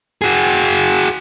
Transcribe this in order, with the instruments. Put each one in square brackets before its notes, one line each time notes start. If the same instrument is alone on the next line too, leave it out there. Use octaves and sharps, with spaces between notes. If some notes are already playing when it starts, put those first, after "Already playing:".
[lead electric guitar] F#4 G#4